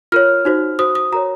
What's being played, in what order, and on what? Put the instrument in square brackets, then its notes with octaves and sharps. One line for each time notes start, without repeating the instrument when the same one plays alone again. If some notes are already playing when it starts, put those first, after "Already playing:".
[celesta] F4 A#4 C#5 F6
D#4 F#4 C5
F#4 C5 D#6
D#6
F#4 A#4 C#5 A#5